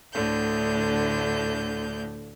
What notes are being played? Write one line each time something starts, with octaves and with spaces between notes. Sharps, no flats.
D2 A2 D3 G6